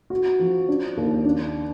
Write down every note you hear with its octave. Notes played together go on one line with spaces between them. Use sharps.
F#4
F3
D4
D#2
D4